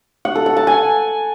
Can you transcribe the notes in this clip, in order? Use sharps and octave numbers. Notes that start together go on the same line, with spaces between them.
F#5
A4
F#5
A5
G#5